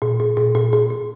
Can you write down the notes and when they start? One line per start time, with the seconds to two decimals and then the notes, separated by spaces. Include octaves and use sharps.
0.02 A#2
0.20 A#2
0.37 A#2
0.55 A#2
0.73 A#2
0.90 A#2